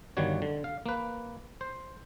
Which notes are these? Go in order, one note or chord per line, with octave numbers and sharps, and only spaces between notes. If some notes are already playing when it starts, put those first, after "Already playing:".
G1 D#3 G3 F#4 C#5
D3
F5
A#3 B4
C5